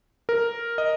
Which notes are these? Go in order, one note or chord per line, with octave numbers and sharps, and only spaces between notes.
A#4
D#5